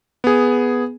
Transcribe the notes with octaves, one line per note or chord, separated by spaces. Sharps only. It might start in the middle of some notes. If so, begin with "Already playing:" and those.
B3 G#4